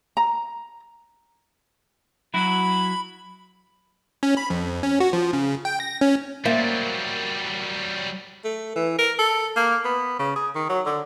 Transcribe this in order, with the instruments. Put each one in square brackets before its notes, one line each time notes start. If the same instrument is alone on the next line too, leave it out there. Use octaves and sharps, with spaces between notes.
[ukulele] A#5
[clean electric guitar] F#3 E4 F#4 [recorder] B5
[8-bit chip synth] C#4
B5
F2
C#4
F#4
F3
C#3
G5
A#6
C#4
[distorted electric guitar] F#3 G3 [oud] A#3 [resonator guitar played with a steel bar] C5 D5 E5
[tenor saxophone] A3
E3
A#4
A4
A#3
B3
C#3
G#4
D#3
F#3
D3